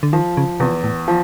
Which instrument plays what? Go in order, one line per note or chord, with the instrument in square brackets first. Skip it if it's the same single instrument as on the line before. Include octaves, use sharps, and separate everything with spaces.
[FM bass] D3
[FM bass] D#3 [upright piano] F3
[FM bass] C#3
[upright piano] E2 [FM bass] C3
[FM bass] A2
[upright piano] F3